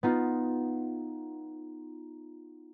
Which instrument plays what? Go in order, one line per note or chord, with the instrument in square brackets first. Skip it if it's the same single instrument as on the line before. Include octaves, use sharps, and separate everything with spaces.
[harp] B3 D#4 F4